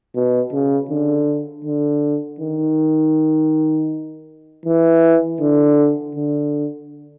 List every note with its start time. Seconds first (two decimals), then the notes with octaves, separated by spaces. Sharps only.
0.15 B2
0.53 C#3
0.90 D3
1.65 D3
2.40 D#3
4.66 E3
5.40 D3
6.15 D3